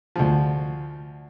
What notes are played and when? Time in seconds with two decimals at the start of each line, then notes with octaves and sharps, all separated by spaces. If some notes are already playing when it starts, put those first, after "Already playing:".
0.16 D2 F3